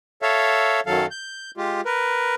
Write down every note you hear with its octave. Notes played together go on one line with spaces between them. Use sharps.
A4 C#5 E5 F5
F#2 D#3 F#3 A4 F5
G6
G#3 F4 G4
A#4 B4